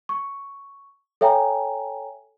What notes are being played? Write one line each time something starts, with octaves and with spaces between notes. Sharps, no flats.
C#6
A4 C#5 E5 G5 G#5 A#5